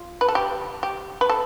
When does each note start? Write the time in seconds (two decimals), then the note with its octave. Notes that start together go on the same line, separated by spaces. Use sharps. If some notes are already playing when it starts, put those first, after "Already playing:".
Already playing: F4
0.21 B4
0.28 A4
0.35 G4
0.83 G4
1.21 B4
1.29 A4